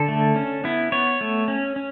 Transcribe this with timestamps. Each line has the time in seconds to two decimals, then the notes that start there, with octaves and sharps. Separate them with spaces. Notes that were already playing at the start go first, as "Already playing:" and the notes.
Already playing: D3 A4
0.08 A3
0.36 C#4
0.64 B3 E4
0.92 B3 C#5
1.21 A3
1.48 C#4
1.76 C#4